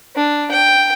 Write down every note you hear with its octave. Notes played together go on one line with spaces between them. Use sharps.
D4
G5